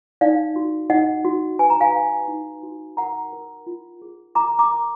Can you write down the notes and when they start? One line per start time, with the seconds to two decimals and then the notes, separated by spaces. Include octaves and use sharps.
0.21 D#4 D5 F5
0.56 F#4
0.90 D#4 D#5 F#5
1.25 F#4
1.59 B4 G#5
1.70 A#5
1.80 F5 G#5
1.94 B4
2.28 D#4
2.63 F#4
2.97 A#4 F#5 A#5
3.33 A#4
3.67 F4
4.02 G#4
4.35 A#4 A#5 D6
4.59 A#5 D6
4.71 A#4